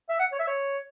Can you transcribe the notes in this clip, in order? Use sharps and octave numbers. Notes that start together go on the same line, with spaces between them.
E5
F#5
C#5
E5
C#5